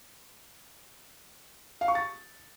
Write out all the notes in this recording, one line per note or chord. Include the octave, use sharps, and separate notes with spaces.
F5
C#6
A6